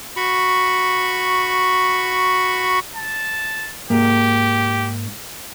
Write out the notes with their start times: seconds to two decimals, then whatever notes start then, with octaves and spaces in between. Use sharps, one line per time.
0.17 F#4 B5 C#6
2.96 A5
3.90 G#2 A#3 G4